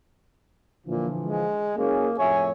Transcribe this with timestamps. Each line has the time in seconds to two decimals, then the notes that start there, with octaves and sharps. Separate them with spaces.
0.86 A#2 D3 E3 F3
1.21 G#3
1.78 F#1 A#3 C#4 G#4
2.19 F2 A2 C#5 E5 G#5